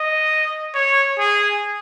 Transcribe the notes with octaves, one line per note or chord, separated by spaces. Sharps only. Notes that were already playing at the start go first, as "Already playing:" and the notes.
Already playing: D#5
C#5
G#4